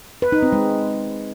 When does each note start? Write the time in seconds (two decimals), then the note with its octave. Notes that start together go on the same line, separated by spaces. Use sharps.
0.22 B4
0.32 D#4
0.42 C4
0.53 G#3